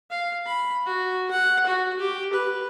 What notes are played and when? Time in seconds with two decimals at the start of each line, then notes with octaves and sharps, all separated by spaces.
0.11 F5
0.46 B5
0.86 F#4
1.31 F#5
1.67 F#4
1.99 G4
2.33 B4